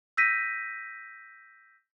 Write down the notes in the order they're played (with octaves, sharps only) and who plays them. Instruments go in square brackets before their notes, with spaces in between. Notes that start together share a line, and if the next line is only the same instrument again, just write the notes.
[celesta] E6 G6 A#6 B6 D#7